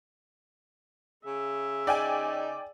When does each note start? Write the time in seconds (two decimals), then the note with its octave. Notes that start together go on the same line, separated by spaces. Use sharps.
1.26 C#3 G#4 E5
1.87 D#4 D5 G5 G#5